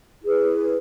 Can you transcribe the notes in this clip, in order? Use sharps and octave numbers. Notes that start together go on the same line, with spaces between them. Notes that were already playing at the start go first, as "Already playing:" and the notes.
E4 G#4 B4